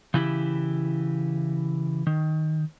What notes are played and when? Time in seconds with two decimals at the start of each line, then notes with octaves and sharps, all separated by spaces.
0.14 C#3 E3 E4 G4
2.07 D#3